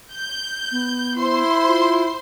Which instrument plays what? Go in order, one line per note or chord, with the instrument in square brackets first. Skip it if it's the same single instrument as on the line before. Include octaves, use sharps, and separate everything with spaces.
[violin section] G6
[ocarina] B3
[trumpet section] E4 [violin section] C5 C6
[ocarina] F4